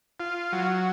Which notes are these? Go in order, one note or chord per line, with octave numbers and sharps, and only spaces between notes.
F4
F#3